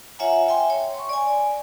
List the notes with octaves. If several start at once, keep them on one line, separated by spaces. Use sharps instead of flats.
F4 C#5 E5 F#5 G#5 A#5
E5 G5 G#5 C6
C#5
C6 C#6
D5 G#5